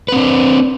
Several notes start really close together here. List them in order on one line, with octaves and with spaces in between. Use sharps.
B4 C4 D4